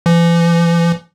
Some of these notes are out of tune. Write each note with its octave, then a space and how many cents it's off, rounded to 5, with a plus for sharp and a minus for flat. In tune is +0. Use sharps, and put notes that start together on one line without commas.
E3 +45